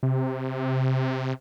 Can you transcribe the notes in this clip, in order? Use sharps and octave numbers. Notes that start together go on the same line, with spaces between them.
C3